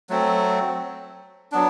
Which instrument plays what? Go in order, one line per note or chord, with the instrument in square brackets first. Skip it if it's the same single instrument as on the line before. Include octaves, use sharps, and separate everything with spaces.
[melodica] F#3 A3 C4
F#3 B3 D4